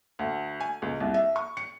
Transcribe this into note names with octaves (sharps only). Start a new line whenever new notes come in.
D2
G#5
C#2
C2
E5
C#6
C#7